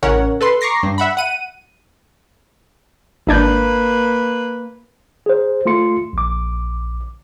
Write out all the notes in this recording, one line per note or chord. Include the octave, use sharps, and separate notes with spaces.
A1 C#3 C#4 A#4 C#5 F#5
A4 B4 C6
A#5 C#6 D6 A#6 C7
G2
E5 F#5 B5
F#5 D#7
G#1 A#3 D4 B4 G6
G#4 C5
A3 F4 C6 C#7
A#1 D6